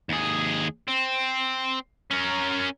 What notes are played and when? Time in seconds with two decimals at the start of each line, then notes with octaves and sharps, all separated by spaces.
0.09 D#2 G#4
0.88 C4
2.11 C#4 A#4